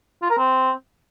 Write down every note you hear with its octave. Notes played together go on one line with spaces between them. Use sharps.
F4
A#4
C4